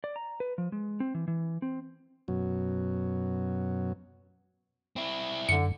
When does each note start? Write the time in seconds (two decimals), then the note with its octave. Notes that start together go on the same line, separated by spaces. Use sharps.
0.04 D5
0.16 A#5
0.40 B4
0.58 F3
0.72 G#3
1.00 C4
1.15 E3
1.28 E3
1.62 C4
2.28 F#2 B2 F#3
4.96 C4 E4
5.49 F#2 D3 C#7